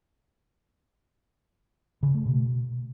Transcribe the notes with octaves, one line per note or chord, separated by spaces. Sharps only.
C#3
A3
B2